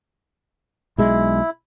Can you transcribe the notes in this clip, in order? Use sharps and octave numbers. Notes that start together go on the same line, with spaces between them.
B1 G#3 E4